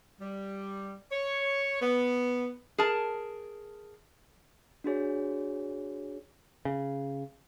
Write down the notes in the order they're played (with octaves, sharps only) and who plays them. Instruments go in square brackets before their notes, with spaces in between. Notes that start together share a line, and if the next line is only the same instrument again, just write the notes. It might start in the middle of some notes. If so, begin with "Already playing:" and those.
[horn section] G3
C#5
B3
[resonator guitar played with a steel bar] G#4 A#4 A5
[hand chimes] D4 F#4 G#4 C#5
[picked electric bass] C#3